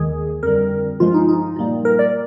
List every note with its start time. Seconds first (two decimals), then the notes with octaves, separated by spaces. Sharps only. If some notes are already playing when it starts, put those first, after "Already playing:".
Already playing: D#2 D#3 G#3 G#4
0.43 F2 D3 G3 A#4
1.00 G2 F3 G#3 F4
1.14 D#4
1.28 D#4
1.56 A#2 G3 A#3
1.85 A#4
1.99 D5